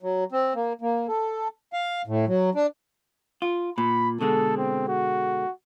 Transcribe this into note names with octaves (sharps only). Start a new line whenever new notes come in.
F#3
C4
A#3
A#3
A4
F5
A2
F#3
D4
F4
A#2 B5
B2 D3 G#3 A4
C4
F#4